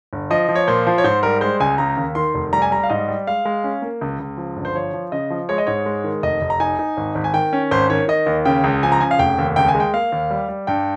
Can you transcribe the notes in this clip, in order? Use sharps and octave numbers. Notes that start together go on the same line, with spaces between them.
G1
F3 D#5
F3
C#5
A#2 C5
F3
C#5
G#2 C5
G3 A#4
G#3 C5
C#2 G#5
C#3 A#5
D#2
D#3 C6
F1
G3 A#5
G#5
G3 A#5
F5
G#2 D#5
G3
G#3 F5
G#3
C#4
A#3
C#2
C#2
F3
G1
C5
F3 C#5
F3
C#3 D#5
F3
G#3 C#5
D#5
G#2 C#5
G#3
D#3
F1 D#5
F1
A#5
D#4 G#5
D#4
G#1
G#1
G#5
D#3 G5
C#4
G#1 C5
D#3 C#5
D#3 D#5
D#2
C#3 G5
C#2
F3 G#5
A#5
C#3 G#5
F5
F1 G5
D#2
C#2 G5
G#5
G#3
G5
A#3 F5
D#2
G3
G3
G2 G5